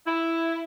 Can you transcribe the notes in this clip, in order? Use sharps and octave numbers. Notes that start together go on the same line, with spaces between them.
E4